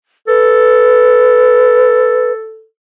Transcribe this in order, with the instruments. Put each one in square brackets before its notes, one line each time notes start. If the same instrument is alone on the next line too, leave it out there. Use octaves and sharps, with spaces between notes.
[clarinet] A4 [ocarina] B4